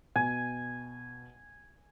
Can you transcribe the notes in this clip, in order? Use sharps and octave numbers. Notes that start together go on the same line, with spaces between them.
B2 G#5